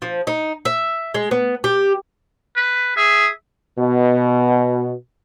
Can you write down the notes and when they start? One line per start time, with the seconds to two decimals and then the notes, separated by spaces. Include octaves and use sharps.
0.02 F3
0.27 D#4
0.65 E5
1.14 G#3
1.31 B3
1.64 G4
2.56 B4
2.97 G#4 E5
3.79 B2